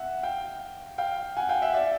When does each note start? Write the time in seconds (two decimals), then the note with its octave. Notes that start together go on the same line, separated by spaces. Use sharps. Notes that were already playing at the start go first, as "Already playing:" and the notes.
Already playing: E5 F#5
0.23 F5 G5
0.98 F5 G5
1.37 F#5 G#5
1.49 F5 G5
1.62 E5 F#5
1.74 D5 E5